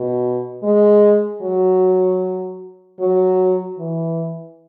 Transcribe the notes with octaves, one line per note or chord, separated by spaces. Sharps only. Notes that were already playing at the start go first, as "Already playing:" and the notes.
Already playing: B2
G#3
F#3
F#3
E3